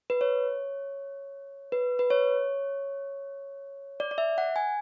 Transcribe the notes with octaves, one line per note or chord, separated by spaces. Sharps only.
B4
C#5
B4
B4
C#5
D5
D5
E5
F#5
G#5